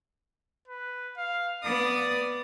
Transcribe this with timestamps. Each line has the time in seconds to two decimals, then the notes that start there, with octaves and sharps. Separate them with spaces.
0.68 B4
1.17 F5
1.64 B3 D5 D#6